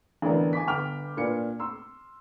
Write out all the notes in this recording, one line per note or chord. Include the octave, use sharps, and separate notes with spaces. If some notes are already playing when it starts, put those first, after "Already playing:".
A1 D3 E3 B3 D4 A#4
G#5 D6 B6
G1 B3 G5 D6 F6 F7
A#2 D4 B4 C#7
C6 E6